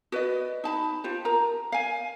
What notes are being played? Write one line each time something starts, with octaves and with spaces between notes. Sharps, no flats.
F#4 B4 D5 D#5
D#4 A5 B5
F4 G4 C5
A#4 A#5
F5 G#5